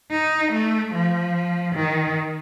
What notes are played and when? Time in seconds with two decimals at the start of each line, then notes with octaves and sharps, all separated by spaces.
0.11 D#4
0.53 A3
0.94 F3
1.76 D#3